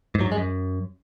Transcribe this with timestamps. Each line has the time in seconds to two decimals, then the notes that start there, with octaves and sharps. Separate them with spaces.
0.15 G#2
0.21 F#3
0.26 G2
0.32 G#3
0.37 F#2